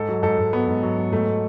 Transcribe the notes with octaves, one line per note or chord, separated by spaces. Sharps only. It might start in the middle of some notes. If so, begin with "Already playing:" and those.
Already playing: G#2 A4
F#3
G#2 A4
G#2
F#3 B3
G#2
F#3
F#3
G#2 A3